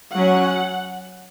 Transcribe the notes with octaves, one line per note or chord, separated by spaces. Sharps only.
F#3 C#4 F#5